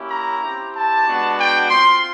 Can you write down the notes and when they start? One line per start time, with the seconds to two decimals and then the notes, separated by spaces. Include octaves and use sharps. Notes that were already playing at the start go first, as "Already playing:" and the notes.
Already playing: A#3 C#4 E4 G4
0.10 A#5
0.42 C4 E4 G4
0.74 A5
1.07 G#3 B3 D4 F#4
1.38 G5
1.70 C4 F4 C6